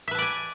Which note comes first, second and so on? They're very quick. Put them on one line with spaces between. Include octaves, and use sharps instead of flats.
E5 B4 A5 D5 G#5